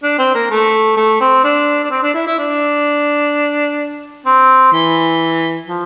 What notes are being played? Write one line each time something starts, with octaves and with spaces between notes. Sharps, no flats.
D4
C4
A#3
A3
A3
C4
D4
D4
C4
D4
E4
E4
D4
C4
E3
F3